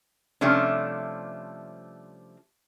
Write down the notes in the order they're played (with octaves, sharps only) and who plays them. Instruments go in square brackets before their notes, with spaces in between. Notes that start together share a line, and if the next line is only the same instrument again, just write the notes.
[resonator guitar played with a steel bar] C3 F3 G3 A3 C#4 D4